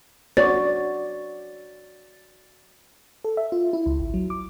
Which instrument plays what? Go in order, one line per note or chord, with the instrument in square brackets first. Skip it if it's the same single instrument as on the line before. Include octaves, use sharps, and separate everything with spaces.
[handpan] F#4 C#5 D5 [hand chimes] A6
[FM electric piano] A4
E5
F4
E4
C#2
G#1
F#3
D6